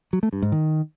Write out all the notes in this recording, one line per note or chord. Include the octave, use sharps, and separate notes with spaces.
F#3
A3
G2
G#2
D#3